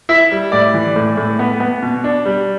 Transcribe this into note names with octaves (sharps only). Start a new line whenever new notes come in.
E4 E5
G3
A2 D5
E3
A2
A2
B3
B3
B2
D4
G3